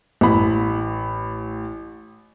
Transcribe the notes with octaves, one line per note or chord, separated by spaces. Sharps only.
A1 B5